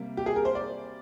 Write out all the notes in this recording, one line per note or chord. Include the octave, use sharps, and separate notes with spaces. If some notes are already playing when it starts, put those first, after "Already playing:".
Already playing: C3 G3 A#3
G4
G#4
A#4
C5
D5